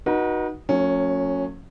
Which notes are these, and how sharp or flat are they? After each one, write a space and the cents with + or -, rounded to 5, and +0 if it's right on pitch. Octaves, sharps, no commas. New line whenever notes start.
D#4 +0 F#4 +0 B4 -40
F#3 -35 A3 +45 C#4 +0